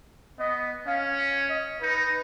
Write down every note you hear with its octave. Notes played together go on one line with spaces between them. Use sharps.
B3 D#5
C#4 F5
D#5
D#4 B4